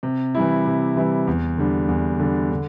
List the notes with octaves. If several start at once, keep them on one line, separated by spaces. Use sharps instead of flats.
C3
E3 G3 E4
C3
E3 G3 E4
E2
D3 G3 D4
E2
D3 G3 D4
D3